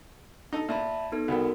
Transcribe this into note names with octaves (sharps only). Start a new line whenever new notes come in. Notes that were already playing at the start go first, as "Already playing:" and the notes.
D#4 A4
A#2 E5 A5 B5
B3 D#4 A4
C2 B3 F#4 A#4